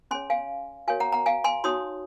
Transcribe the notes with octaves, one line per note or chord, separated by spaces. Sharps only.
C#4 G#4 C#5 G#5 C6
F5 G#5
F#4 A#4 C#5 F5 G#5
F#5 A#5
F#5 A#5
F5 G#5
G#5 C6
D#4 F#4 C#5 C6 D#6